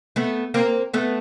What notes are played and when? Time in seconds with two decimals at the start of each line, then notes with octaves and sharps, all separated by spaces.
0.16 A3 B3
0.54 A#3 C4
0.94 A3 B3